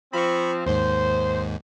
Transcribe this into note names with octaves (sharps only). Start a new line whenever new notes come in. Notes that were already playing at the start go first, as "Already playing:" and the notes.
F3 C4 B5 C#6
D#2 G#2 C5